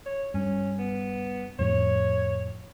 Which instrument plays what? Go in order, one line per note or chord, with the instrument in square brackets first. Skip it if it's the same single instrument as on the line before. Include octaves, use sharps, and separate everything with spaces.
[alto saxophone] C#5
[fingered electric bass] G2 [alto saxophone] C#4
[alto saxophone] B3
[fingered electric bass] F2 A2 F3 [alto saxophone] C#5